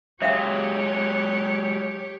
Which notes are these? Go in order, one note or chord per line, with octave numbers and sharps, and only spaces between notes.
F#3 G#3 G4 C#5 E5 F5 G5